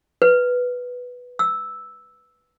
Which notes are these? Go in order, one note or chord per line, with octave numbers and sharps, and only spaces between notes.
B4
E6